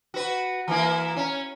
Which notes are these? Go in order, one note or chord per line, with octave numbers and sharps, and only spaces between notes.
F#4 B4
E3 A#3 E4
C#4